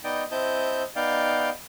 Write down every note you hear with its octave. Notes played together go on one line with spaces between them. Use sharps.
B3 D#4 D5 D#5 G5
C4 E4 D#5 A5 G6
B3 D#4 D5 F5 G5